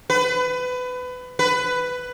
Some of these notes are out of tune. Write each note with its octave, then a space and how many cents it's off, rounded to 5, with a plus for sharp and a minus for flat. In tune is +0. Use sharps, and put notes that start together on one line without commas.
B4 +25
B4 +10